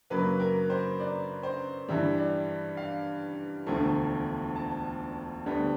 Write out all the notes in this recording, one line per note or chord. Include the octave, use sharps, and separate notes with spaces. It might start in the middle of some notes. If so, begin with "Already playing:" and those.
F#2 C#3 F#3 A#3 B4
A#4
C5
D5
C5
G2 E3 G3 E5
D5
F5
E1 D2 D3 F3 A3
A5
D2 D3 G3 B3